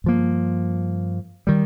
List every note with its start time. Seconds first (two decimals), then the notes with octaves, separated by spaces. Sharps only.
0.04 G2 F3 A#3
1.47 D#3 G3